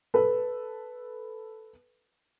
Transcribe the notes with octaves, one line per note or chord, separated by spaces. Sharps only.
A4 B4